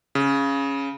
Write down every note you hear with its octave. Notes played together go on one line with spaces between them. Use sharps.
C#3